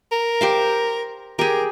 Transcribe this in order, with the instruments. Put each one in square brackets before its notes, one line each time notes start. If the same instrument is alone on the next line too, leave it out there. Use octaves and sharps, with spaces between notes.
[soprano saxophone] A#4
[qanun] G4 C5 F5
[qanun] G4 G#4 [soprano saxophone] A#4